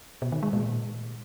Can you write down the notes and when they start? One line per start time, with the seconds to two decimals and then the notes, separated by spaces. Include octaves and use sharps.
0.22 B2
0.32 D#3
0.43 G#3
0.53 A#2